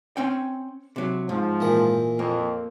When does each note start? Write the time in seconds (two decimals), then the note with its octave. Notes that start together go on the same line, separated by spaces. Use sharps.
0.17 C4 C#4 G5
0.96 C3 F#3
1.29 G#2 F3
1.60 A#2 E3 D#6
2.19 F2 A#3